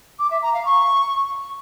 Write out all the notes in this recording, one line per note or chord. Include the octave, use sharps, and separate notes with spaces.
D6
E5
A#5
F5
C#6